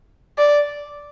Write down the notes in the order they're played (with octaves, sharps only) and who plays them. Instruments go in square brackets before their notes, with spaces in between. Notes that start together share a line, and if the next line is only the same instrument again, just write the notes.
[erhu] D5